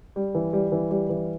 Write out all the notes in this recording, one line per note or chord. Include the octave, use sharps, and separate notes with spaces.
G3
E3
G3
E3
G3
E3